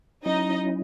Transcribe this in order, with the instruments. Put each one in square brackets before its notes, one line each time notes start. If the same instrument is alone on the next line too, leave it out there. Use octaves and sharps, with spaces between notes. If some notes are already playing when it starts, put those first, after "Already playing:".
[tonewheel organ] F#3 C#4 E4 [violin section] D#4 D#5